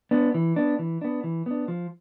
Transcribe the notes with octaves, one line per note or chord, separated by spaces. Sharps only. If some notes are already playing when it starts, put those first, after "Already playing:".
B3 D4
E3
B3 D4
E3
B3 D4
E3
B3 D4
F3